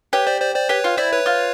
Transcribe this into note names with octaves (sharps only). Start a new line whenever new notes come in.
G4 B4 C#5
C5 D5
C5 D5
C5 D5
G4 B4 C#5
F4
E4 C5 D5
B4 C#5
F4